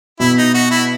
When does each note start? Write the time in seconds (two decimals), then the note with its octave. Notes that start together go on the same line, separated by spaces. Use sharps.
0.20 B2 E4
0.37 D#4
0.54 F#4
0.71 E4